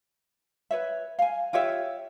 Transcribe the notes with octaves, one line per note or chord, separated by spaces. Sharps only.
B4 C#5 E5
F5 G#5
F4 G4 C#5 E5